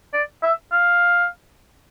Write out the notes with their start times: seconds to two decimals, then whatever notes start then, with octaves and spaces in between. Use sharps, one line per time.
0.13 D5
0.43 E5
0.73 F5